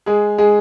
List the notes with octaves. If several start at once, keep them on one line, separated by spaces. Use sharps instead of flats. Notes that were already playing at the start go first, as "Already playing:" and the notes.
G#3 G#4
G#3 G#4